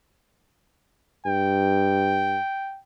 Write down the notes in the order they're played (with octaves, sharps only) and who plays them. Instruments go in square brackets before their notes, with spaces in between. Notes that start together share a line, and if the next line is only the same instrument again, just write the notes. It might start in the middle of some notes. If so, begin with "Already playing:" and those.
[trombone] G2 [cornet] G5